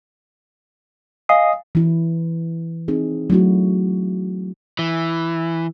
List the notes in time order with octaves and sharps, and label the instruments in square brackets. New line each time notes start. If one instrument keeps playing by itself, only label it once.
[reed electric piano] D#5 D#6 [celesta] F5 G#5 C7
[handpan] E3 E4
C4 D#4 G#4
F#3 A3 E4 F#4
[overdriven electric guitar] E3